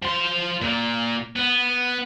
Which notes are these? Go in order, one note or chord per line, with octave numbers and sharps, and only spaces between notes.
F3 C6
A#2 A#3
B3